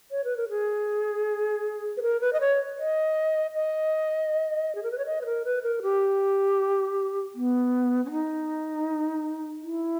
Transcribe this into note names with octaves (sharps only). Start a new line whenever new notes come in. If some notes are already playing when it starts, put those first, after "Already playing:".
C#5
B4
A#4
G#4
B4
A#4
B4
D#5
C#5
D#5
D#5
G#4
A#4
B4
C#5
D#5
B4
A#4
B4
A#4
G4
B3
C#4
D#4
E4